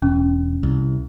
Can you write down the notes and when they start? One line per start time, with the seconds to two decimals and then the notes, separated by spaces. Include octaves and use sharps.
0.02 E1 C#4
0.63 C2